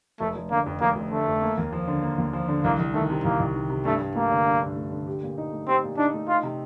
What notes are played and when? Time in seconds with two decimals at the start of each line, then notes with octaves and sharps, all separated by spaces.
0.20 F1 A3
0.36 F1
0.51 D3 A#3
0.66 F2
0.81 F1 A#3
0.96 F1
1.11 D3 A3
1.27 F2
1.42 A#3
1.58 D#2
1.72 F3
1.88 D3
2.03 A#3
2.18 D#2
2.33 F3
2.48 D3
2.64 C2 A#3
2.79 C2
2.94 D#3 A3
3.10 C3
3.24 C2 A#3
3.40 C2
3.55 D#3
3.70 C3
3.85 G2 A3
4.01 G2
4.16 A3 A#3
4.31 D3
4.46 G2
4.62 G2
4.77 A3
4.92 D3
5.07 G4
5.23 A#2
5.38 D#4
5.52 A3
5.68 C4 G4
5.84 A#2
5.98 D4 D#4
6.14 A3
6.28 D#4 F4
6.43 C3